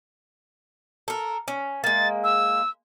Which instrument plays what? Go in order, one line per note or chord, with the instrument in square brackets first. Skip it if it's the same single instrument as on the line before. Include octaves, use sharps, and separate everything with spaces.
[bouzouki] A4 A#4
C#4
[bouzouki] G#3 A#3 [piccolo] A6
[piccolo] E6